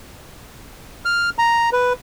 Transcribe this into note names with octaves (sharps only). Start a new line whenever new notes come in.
F6
A#5
B4